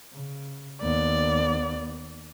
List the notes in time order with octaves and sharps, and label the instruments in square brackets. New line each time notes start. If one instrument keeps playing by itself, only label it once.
[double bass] C#3
[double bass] D#2 B3 [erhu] D5